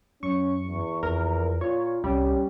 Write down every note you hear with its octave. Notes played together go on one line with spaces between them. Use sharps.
F#2 C#4 C#6
E2
F2 A#4
A#2 F4 C#5
C2 G3 C#4